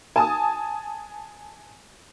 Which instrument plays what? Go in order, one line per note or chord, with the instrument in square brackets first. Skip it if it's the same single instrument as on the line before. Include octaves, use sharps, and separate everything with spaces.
[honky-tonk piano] G#5 A5 D#6